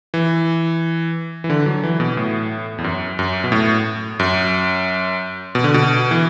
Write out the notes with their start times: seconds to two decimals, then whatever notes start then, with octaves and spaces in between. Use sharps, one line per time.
0.14 E3
1.44 E3
1.50 D3
1.66 F#3
1.83 E3
2.00 B2
2.17 A2
2.78 E2
2.84 F#2
3.19 F#2
3.44 B2
3.52 A2
4.20 F#2
5.55 B2
5.64 D3
5.74 B2
6.11 E3